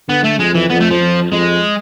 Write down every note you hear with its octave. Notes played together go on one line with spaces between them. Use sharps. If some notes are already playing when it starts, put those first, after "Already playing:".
D3 B3
A3
F2 G#3
E3
F2 B3
A3
F3
F2
F2 G#3